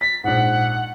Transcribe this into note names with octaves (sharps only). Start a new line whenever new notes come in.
A6 B6
A#1 G#2 F#5